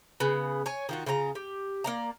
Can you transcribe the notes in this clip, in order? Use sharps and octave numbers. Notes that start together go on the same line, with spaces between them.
C#3 B3
C#5 G#5
D#3 F4 F#4
C#3 F4 B4 A#5
G4
A#3 D5 A#5